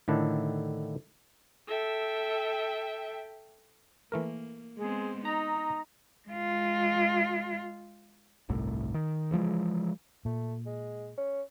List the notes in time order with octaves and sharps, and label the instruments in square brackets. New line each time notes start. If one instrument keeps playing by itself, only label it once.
[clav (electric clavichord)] A2 D3 D#3 D4 E4
[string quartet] A4 E5 G5
[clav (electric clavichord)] E3 A3 A#4 [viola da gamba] A#3
[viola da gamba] G#3 B3 C4 [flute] G#4
[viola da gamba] D#4 [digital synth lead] A#5 [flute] D#6
[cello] G#3 F4
[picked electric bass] G1 C2 A2
D#3
C#3 E3 F3 G#3
[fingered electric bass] A#2 [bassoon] A3
[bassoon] G#3
C#4